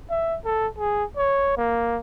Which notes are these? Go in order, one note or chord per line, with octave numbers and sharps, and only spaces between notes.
E5
A4
G#4
C#5
A#3